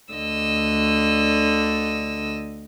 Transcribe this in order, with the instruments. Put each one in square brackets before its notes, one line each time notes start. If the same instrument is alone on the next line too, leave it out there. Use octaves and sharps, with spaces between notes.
[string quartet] D2 D3 D#5 E6